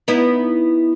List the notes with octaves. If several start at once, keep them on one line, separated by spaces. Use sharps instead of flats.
B3 D#4 E4